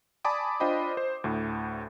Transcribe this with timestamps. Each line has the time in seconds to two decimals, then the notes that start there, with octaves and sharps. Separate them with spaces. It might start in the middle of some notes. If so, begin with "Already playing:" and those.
0.25 D5 G#5 A5 B5 D6 D#6
0.60 D4 F4 C5 D#5 G5 B5
0.97 C5
1.24 D2 A2